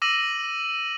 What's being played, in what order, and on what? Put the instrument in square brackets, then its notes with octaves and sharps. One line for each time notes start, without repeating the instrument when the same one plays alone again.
[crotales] D6 E6 A#6 D#7 F#7